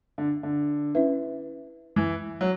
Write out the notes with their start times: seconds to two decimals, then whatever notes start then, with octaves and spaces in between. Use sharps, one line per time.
0.18 D3
0.43 D3
0.95 C#4 E4 B4 E5
1.96 E3
2.41 F#3